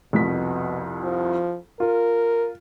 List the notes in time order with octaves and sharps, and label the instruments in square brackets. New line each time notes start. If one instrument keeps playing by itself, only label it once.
[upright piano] C2 F2 B6 [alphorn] B2
[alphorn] F3
[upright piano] F4 [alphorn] A#4